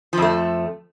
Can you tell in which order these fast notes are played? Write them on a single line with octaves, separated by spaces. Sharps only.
F3 F2 A3